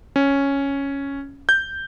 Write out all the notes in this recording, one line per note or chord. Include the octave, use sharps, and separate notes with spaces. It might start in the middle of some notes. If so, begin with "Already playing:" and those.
C#4
G6